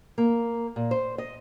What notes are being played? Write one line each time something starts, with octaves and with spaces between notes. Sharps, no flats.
A#3
A#2
C5
D#5